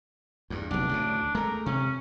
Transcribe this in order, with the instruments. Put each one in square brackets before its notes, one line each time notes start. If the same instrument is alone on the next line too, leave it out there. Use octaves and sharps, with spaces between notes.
[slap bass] E2 G2
[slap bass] F1 B1 [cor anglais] D4
[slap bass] D2 A2 C#3
[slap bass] G#3 A3 [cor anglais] A#4
[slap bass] C3 [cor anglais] C#4